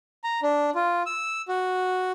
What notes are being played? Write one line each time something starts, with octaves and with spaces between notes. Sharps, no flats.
A#5
D4
F4
E6
F#4